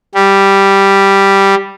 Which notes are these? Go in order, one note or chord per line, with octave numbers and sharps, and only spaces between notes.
G3